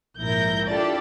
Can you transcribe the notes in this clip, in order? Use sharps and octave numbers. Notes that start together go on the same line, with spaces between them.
A#1 G#2 E4 A#4 G6 A#6
D4 E4 F4 G4 A4 D5